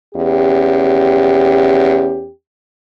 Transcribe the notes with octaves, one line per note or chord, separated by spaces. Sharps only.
E2 C#4 G4